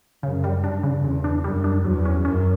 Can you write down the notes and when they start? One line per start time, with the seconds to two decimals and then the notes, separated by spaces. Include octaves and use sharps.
0.23 F#2 C#3
0.44 G3
0.64 G2 D4
0.83 C#3
1.04 E2 C#3
1.24 D4
1.44 F#2 G3
1.64 D4
1.85 E2 F#3
2.05 C#4
2.25 F#2 C#4